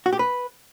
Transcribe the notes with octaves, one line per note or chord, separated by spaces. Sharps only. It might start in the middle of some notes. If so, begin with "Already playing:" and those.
F#4
G4
B4